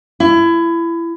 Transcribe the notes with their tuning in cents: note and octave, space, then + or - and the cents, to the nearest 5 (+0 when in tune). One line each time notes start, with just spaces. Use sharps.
E4 +25